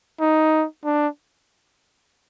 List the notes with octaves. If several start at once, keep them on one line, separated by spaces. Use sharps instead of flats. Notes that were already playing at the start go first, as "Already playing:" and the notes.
D#4
D4